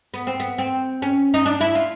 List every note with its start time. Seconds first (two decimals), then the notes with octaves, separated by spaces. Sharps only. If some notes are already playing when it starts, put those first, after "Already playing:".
0.14 B3
0.27 C4
0.40 B3
0.58 C4
1.02 C#4
1.34 D#4
1.46 D4
1.61 E4
1.75 F4